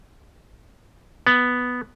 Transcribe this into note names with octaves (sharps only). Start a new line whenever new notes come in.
B3